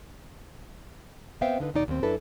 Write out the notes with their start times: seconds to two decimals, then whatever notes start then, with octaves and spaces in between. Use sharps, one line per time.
1.41 B3 C4 C5 E5 F5 G5
1.60 D3 D#4 B4
1.74 D#2 B2 D#4 D5
1.88 D#2 C4
2.03 F#2 D4 E4 A4 B4